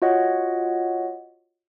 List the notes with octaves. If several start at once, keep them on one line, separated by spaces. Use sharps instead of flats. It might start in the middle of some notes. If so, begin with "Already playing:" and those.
F4 F#4 C#5 D#5 F#5